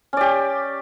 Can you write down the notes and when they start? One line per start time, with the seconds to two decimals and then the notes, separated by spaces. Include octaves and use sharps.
0.13 C#4
0.17 D5
0.21 G4